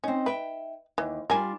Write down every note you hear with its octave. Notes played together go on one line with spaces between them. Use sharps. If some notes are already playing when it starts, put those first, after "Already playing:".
C4 C#4 D#4
B4 E5 G5
D#2 E3
G3 D4 F4 A#4 G#5